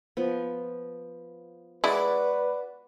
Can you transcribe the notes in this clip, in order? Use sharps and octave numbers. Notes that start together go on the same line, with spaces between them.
F3 B3
G#3 E4 F#4 B4 D5